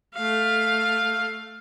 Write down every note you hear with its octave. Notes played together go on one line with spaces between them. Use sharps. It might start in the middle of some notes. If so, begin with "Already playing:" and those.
A3 F5